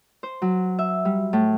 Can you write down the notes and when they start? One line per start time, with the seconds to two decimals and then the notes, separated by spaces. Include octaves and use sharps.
0.23 C5
0.42 F#3
0.79 E5
1.05 G3
1.33 A2